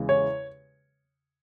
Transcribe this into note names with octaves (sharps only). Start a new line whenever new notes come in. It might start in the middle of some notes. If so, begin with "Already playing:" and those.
Already playing: E2 C#3 G#3
C#5